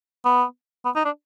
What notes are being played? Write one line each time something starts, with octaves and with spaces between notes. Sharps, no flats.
B3
B3
D#4
D4